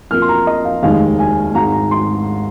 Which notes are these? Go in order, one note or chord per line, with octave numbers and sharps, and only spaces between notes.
F2 F3 A#3 F6
C6
A#5
D#5
F5
F1 D#2 D#3 G#3 F5
G#5
G#1 G#2 D#3 G#3 A#5
A#5
C6